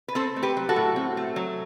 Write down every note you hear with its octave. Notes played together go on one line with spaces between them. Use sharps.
B4
C4 A4 C5
A3
G4 B4
F#3
F#4 A4
A2
C4
A3
F#3